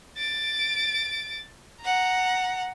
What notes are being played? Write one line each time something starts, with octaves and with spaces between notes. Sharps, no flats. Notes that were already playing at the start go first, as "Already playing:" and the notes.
A6 D7
F#5 A#5